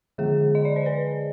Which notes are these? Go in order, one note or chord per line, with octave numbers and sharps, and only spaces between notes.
D3 F3 G#3 G#4
D#5
D5
C5
B4